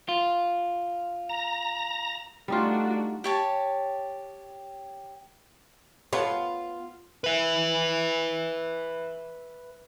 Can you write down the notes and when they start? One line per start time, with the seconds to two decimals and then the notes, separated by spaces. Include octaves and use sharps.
0.09 F4
1.29 A#5
2.48 G3 A3 D4 D#4 F4 F#4
3.24 G4 C#5 A5
6.13 B3 F4 A4 B4 C#5
7.24 B4 E5